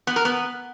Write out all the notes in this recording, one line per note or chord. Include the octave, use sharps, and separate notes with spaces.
B3
A#4
B3